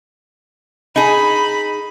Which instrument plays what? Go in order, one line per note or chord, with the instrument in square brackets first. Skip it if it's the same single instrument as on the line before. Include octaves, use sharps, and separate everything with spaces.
[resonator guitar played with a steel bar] D#4 G#4 [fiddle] B5